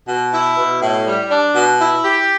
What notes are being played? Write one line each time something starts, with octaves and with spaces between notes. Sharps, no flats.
B2
E4
B2
A2
G3
D4
B2
E4
G4